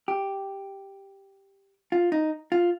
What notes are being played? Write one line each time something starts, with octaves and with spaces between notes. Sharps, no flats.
G4
F4
D#4
F4